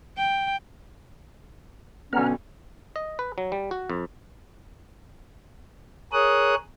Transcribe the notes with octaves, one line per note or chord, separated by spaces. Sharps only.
G5
B1 D3 B3 C#4 F#5 A#5 F6
D#5
B4
F#3
G3
F#4
F2
G#4 A#4 C#5 D#6 F#6